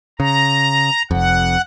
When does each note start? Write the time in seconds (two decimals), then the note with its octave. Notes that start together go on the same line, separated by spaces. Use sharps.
0.20 C#3 A#5
1.11 F1 F2 F#5